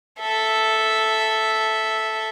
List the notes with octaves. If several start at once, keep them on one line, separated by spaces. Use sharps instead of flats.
A4 E5